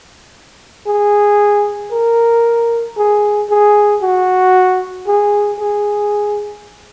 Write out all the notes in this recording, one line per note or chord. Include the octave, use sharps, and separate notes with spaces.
G#4
A#4
G#4
G#4
F#4
G#4
G#4